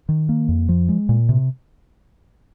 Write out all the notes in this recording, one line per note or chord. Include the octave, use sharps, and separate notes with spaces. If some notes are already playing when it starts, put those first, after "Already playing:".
D#3
A#3
F2
F3
G#3
A#2
C3